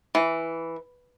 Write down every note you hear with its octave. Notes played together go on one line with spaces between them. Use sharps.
E3